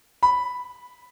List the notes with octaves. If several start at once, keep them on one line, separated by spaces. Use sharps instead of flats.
B5